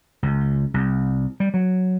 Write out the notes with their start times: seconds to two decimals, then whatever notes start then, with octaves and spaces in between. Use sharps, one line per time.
0.23 C#2
0.74 C2
1.40 G3
1.54 F#3